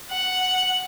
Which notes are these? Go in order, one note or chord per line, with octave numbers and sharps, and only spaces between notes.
F#5